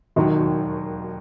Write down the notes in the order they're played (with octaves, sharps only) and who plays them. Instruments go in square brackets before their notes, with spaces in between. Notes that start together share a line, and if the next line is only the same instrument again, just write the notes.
[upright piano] E1 D#2 D#3 F#3